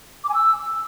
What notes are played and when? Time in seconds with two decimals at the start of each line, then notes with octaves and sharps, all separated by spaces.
0.24 D6
0.29 G#5
0.34 E6